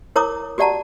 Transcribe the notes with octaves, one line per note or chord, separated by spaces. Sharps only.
E4 A#4 C#5 A#5 D6 D#6
F#4 G4 D5 F#5 A5 A#5